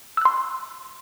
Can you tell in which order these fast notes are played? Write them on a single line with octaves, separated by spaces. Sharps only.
E6 F#6 C6